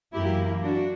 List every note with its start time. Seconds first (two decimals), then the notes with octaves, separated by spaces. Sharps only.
0.13 F#2 E3 A#3 E4 G4
0.63 D4 F#4